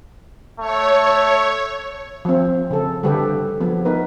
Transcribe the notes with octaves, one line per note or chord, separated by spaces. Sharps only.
A3 C#5
F3 C4
C#3 A4
D3 G3 D4 G4 A4 B4
F3 B3
B3 D#4 A#4 B4